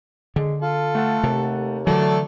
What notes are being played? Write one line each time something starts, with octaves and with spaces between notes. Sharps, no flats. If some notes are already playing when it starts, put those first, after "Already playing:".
D3 G#3
F4 A4
A3 F#5 A5
D#2 C3
D3 E3 F#3 A3 A4 D5